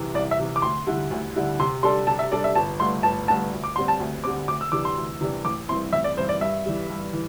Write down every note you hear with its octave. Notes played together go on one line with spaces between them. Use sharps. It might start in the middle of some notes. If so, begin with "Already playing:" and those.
Already playing: C2 C3 E3
C2 D5
E5
C3 E3
D6
D2 C6
D3 G3 E4
D2
D3 G3 E4
C3 C6
G3 D4 A4 C6
C3 A5
E5
G3 D4 A4 D5
E5
G1 A5
G2 D3 A3 C6
G1 A5
G2 D3 A3 A5
D2
D6
D3 G3 C4 C6
A5
D2
D3 G3 C4 D6
D2 D6
E6
C3 E3 G3 D4 D6
C6
D2
C3 E3 G3 D4
A1 D6
G2 E3 C4 E4 C6
A1 E5
D5
G2 E3 C4 E4 C5
D5
G2 E5
E3 G3
G2
E3